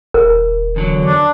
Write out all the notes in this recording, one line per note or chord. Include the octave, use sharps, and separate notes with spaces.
D#1 A#4
E2 D3 F#3
D4